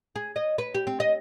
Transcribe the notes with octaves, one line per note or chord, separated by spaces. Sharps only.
G#4
D#5
B4
G4
C4
D#5